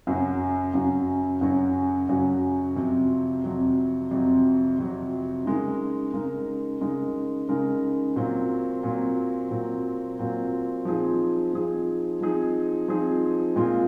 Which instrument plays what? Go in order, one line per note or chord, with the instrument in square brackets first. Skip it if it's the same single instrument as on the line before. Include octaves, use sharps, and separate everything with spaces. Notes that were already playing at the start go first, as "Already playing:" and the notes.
[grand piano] F#2 C#3 F#3 C#4 F#4
F#2 C#3 F#3 C#4 F#4
F#2 C#3 F#3 C#4 F#4
F#2 C#3 F#3 C#4 F#4
F2 C3 F#3
F2 C3 F#3
F2 C3 F#3
F2 C3 F#3
C#3 G#3 D#4 A#4
C#3 G#3 D#4 A#4
C#3 G#3 D#4 A#4
C#3 G#3 D#4 A#4
A#2 F#3 C4
A#2 F#3 C4
A#2 F#3 C4
A#2 F#3 C4
F3 C4 D#4 G#4
F3 C4 D#4 G#4
F3 C4 D#4 G#4
F3 C4 D#4 G#4
A#2 G#3 C4 F4